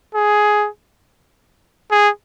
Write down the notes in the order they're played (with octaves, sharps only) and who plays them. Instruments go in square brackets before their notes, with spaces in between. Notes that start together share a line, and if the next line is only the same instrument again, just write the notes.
[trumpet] G#4
G#4